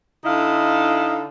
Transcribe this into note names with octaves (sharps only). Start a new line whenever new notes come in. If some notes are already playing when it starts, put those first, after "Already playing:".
D3 D#4 E4 F5